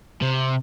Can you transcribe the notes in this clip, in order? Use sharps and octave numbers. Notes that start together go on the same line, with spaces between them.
C3